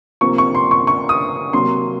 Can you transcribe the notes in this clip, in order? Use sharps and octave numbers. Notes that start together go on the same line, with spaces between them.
C3 F3 A#3 C#6
C#6
C6
C#6
C#6
D#6
C3 F#3 A#3 C6